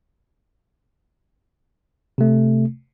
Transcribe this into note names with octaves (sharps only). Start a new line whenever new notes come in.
C3 A3